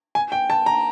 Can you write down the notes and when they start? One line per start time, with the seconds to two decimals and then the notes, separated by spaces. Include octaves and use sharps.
0.15 G#5
0.32 G5
0.50 A5
0.66 A#5